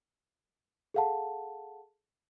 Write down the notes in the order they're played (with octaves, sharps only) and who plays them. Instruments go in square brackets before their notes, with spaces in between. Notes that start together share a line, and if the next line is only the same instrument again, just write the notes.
[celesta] G#4 A4 F5 F#5 A5